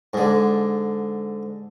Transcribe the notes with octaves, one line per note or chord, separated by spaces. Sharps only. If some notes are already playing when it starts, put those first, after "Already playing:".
G#2 D3